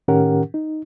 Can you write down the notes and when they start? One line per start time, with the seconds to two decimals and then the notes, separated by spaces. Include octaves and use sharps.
0.08 A2 D#3 C#4 G4 A#4 F#5
0.54 D#4